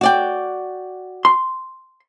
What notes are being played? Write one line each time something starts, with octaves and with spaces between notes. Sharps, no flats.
F#4 D5 G5
C6